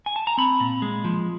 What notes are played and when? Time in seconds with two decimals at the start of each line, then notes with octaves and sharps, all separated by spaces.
0.06 G#5
0.16 A5
0.27 A#5
0.38 C4 B5
0.60 A#2
0.82 G#3
1.04 F3